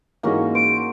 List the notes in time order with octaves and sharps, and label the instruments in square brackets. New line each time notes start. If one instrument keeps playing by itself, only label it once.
[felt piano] G#2 E3 G#3 [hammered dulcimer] A#3 C#4 F#4
[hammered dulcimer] C5 [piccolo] D7